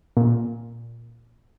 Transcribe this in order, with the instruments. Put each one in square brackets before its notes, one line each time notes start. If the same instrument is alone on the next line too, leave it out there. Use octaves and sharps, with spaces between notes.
[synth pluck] A#2